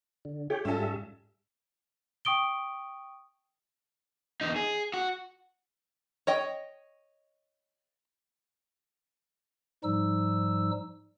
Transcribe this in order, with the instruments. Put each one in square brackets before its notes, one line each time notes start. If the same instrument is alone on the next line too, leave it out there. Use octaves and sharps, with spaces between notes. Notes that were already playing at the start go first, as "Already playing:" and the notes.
[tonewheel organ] D3
[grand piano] G4 [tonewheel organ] G#4 C#5 G5
[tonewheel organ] G#2 G3 E5 [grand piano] C#4 F4 A4
[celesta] G5 C#6 D#6 D7 G7
[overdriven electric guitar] E2 D#4
G#4
F#4
[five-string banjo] C#5 D#5 G5
[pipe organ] G#2 F3 G3 D#4 E6